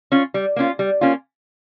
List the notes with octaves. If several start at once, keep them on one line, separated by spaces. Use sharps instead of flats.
C#4 F4
G3
A#3 C#4 F4
G3
A#3 C#4 F4